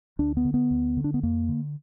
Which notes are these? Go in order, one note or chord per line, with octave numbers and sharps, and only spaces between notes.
D2 D4
B3
D3
B3
D2
D3
D4
B3
F2 A#3
D3